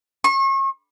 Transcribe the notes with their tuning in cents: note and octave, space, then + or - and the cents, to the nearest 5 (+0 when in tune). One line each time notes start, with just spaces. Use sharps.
C#6 -40